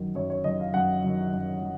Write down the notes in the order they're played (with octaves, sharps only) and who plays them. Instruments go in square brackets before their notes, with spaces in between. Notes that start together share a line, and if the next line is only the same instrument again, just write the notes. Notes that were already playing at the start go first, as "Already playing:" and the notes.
Already playing: [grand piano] F#2 D#3 F#3
F#2 C#5
C#5
D#3 F#3 D#5
F5
F#2 F#5
D#3 F#3
F#2
F#3